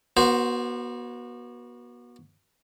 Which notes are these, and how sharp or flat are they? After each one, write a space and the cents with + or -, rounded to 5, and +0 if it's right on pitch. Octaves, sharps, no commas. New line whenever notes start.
B3 -40 F#4 +0 C5 +0